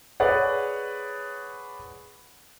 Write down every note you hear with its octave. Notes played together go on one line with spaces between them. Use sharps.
G#4 B4 C#5 D5 F#5